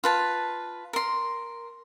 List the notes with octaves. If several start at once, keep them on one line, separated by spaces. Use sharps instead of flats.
F4 B4 A5
A#4 C6